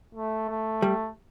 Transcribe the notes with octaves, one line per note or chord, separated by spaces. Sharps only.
A3
A3
G3